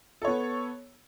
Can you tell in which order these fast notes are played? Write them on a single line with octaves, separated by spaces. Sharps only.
A4 C#5 B3